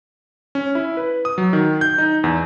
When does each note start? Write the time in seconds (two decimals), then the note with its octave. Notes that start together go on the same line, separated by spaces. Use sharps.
0.55 C#4
0.75 E4
0.97 B4
1.25 D#6
1.38 F#3
1.53 D#3
1.81 G6
1.98 D#4
2.24 E2